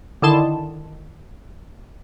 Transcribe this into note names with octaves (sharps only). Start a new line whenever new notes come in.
D3 D#3 E4 A5 C6 E7